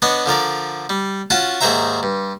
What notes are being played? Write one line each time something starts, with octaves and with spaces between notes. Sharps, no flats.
B3 D4 C#5 D#5
D3 F3 A#4 D5
G3
C#4 F4 F#4 F#5 A5
D#2 G#2 G#4 C5 E5 A#5
G2